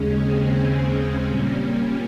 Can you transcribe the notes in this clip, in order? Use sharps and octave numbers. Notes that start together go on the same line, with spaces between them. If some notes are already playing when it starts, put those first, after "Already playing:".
Already playing: D#2 C#3 G#3 C#4
C4
C#4
A#2 G3 A#3 C#4